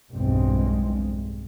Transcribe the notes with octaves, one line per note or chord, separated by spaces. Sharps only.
B1 E2 G2 G#3 C4